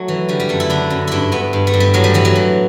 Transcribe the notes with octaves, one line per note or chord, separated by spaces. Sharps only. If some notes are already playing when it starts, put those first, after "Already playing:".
Already playing: F#3 A3
E3
D3 G3
G3
F#2 A3
E4
D3 D4
F#2
G2 D4 E4
G2 B3
G2
A3
G2
G3
A2 F#3
G3
E3 B3
F#3
E3